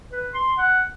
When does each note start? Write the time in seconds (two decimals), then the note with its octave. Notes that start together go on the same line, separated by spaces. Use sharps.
0.11 B4
0.33 C6
0.58 F#5